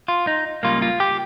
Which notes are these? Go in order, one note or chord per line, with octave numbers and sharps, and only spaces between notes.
F4
D#4
C#2 C#3 G3 A#3 F4
F4
G4